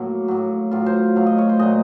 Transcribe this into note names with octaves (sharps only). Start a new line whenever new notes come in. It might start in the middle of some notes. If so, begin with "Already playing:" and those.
Already playing: A2 F#3 A#3
A2 F#3
A2 F#3 F4
C5
A2 F#3 F5
D#5
C#5
C5
A#2 F#3 D#5